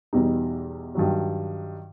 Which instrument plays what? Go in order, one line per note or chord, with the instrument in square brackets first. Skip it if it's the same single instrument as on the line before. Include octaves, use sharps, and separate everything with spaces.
[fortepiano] E2 B2 G3 D#4
G2 D#3 F#3